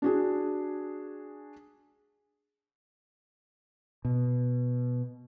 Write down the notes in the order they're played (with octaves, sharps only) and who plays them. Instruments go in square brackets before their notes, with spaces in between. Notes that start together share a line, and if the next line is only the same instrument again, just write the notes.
[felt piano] D4 F#4 G#4
[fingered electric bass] B2